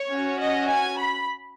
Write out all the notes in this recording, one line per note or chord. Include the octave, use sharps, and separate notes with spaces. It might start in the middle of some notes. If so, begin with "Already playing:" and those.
Already playing: C#5
C#4 F#4
D#5
G#5
B5